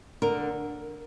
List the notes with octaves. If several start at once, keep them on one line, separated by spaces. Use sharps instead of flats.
D3 A#4